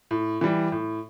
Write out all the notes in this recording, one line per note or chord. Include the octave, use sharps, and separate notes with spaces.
A2
E3 G3
A2